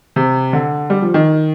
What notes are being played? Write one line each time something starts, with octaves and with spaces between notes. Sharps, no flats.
C3
D3
G3
F3
D#3